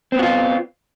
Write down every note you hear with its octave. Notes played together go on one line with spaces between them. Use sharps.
B3 C4 F4 F#4